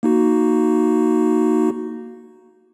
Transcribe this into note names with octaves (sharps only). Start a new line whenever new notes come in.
A#3 D#4 F#4